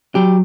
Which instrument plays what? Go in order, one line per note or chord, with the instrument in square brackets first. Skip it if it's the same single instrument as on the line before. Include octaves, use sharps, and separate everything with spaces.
[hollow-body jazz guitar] F#3 G4